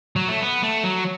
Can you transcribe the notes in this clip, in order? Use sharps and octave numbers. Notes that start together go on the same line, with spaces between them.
F#3
A3
B3
A3
F#3